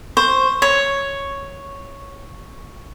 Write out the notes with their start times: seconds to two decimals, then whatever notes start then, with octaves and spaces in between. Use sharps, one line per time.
0.17 C5 C#6
0.62 C#5